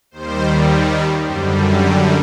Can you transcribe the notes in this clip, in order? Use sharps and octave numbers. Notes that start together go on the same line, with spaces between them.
D#2 D#3 G3 C5
F#2 D3 G3 C5
D5
D5